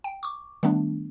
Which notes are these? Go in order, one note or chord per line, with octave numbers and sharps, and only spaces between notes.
G5
C#6 D6
D#3 G3 A3 B3 D4